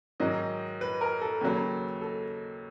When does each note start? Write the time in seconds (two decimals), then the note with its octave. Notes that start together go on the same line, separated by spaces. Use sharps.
0.20 G#2 D#3 F#3 D#5
0.81 B4
1.01 A#4
1.22 A4
1.41 D#2 C#3 F#3
2.02 A4